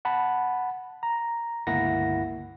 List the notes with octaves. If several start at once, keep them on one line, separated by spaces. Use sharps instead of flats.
F#5 A5 B5
A#5
G1 C#2 A#3 E4 F#5 A#6